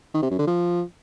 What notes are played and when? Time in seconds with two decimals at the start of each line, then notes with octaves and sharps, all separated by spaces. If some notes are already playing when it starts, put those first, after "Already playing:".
0.14 D#3
0.22 C3
0.30 F#2
0.39 D3
0.47 F3